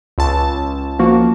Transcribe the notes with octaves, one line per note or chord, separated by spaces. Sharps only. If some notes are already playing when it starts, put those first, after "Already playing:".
C#2 A5
F3 A#3 F#4